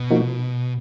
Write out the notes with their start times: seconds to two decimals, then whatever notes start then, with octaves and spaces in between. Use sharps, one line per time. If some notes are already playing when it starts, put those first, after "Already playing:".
Already playing: B2
0.11 F3 A#3 D#4 F#4